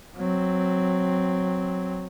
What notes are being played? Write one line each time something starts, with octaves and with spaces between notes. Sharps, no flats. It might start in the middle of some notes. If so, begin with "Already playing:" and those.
F#3 C4